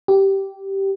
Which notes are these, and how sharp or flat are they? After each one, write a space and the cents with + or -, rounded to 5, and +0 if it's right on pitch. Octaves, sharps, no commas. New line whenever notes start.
G4 -10